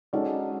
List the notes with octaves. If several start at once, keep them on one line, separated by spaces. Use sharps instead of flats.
G#3 C#4 D#4 F#4 A4 D5